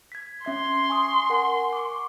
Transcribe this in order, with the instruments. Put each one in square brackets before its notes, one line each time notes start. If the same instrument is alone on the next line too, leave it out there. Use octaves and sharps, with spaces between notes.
[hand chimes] G#6 B6
[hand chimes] C#4 E5 G#6 [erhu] C6
[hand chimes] G#5 C#6 D#6
A#4 F#5 G#5
C#6 D6